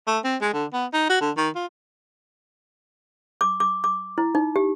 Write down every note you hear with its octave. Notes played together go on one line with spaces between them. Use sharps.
A3
C4
G#3
D3
B3
D#4
F#4
D3
D#3
F4
D6
D6
D6
E4
D#4
G4